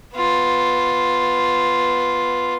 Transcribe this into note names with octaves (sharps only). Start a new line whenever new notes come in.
B3 F4